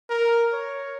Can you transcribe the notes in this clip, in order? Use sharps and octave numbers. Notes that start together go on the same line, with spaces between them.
A#4
C#5